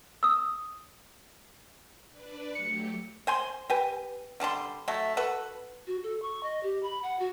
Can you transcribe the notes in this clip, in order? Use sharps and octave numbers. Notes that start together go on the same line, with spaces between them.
D#6 E6
D4 B4 D5
F#3 A3 G4 C#7
C5 G#5 C6
G4 B4 G#5
D3 G3 A5 C6
F#3 A3
F#4 A4 B4
F#4
A4
C#6
D#5
G4
B5
F#5
F#4